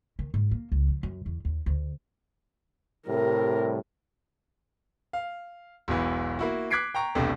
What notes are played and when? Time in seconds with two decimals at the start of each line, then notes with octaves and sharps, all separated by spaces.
0.19 D#3
0.34 G#2
0.51 A#3
0.72 C#2
0.88 F3
1.03 F#2
1.26 E2
1.45 D#2
1.66 D2
3.07 A2 C3 G3 A#4
5.13 F5
5.88 E1 B1 E3
6.39 A#3 E4 F#4
6.71 D6 F#6 G#6 B6 C7 D7
6.94 G5 A#5 C#6
7.15 E1 C2 B2 A3 D4 G4